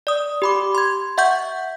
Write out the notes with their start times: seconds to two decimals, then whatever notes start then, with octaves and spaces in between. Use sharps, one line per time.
0.07 D5 D#6
0.42 G4 B5 D6
0.75 C6 G#6
1.18 E5 F#5 C#6 G6